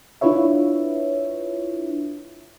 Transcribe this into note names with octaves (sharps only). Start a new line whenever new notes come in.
D4 E4 F4 B4 C#5 E5